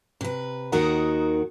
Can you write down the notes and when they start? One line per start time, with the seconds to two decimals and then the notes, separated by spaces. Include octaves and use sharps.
0.21 C3 B4
0.72 D#2 D#3 D#4 F#4 A#4 F#5